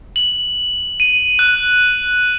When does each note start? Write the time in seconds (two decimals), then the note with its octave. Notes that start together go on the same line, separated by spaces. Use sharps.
0.16 F#7
1.00 D#7
1.39 F#6